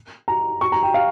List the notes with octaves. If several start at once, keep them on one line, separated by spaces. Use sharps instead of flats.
A#5
C#6
A#5
G5
F5